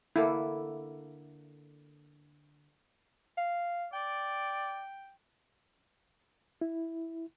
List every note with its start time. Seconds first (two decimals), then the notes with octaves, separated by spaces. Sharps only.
0.16 D3 A#3 E4 A4
3.37 F5
3.93 D5 G5
6.61 E4